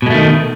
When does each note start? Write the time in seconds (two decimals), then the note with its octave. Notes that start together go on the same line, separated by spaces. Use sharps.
0.02 B2
0.06 G#3
0.10 A3
0.14 D#3